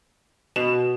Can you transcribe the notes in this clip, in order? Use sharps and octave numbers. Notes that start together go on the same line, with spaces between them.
B2 E7